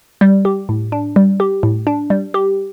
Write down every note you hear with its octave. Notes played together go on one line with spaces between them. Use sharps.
G3
G4
A2
D4
G3
G4
A2
D4
G3
G4